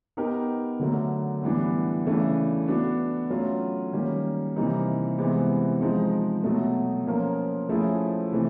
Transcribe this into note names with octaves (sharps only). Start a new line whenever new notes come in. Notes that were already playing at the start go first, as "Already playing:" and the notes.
B3 D#4 G4 A#4
D3 F#3 A3
A2 E3 G3 B3 D4
C#3 E3 A3 D4
B3 D4 F#4
F#3 A3 C#4 F4
D#3 G3 A#3 C#4
C3 E3 G3 A#3 D#4
C3 E3 G#3 B3
F3 G#3 C4 D#4
B2 F#3 A3
F3 A#3 C#4 F4 A#4
F3 A3 C#4 E4 G#4
C3 E3 A3